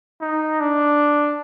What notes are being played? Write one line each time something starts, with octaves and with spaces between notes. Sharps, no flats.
D#4
D4